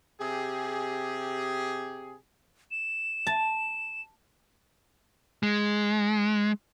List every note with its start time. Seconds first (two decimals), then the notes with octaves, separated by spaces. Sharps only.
0.20 C3 G4 G#4
2.71 E7
3.27 A5
5.43 G#3